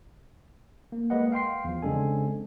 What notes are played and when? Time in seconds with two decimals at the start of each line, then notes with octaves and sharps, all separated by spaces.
0.92 A#3
1.10 G#3 A#3 B4 D#5 F#5
1.32 F5 G5 C6 C7
1.64 E2 F3
1.82 C#3 G#3 C4 D4 A4 G#5